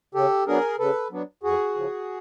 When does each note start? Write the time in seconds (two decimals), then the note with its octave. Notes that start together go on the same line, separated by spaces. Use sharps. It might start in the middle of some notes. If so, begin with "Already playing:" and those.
0.15 C#3 G4 A4
0.47 F#3 B3 D4 G#4 A#4
0.79 C#3 A4 B4
1.11 F#3 B3 D4
1.43 F2 F#4 G#4
1.75 C#3 F3